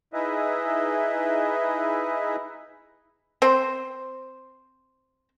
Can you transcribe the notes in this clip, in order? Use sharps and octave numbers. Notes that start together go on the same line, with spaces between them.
D#4 E4 G#4 B4 D#5 E5
C4 C5